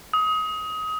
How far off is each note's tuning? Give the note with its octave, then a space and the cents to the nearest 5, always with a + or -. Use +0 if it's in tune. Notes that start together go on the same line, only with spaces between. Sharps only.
D#6 +25